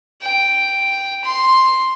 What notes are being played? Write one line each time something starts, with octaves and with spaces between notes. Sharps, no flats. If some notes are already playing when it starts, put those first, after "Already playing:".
G5
C6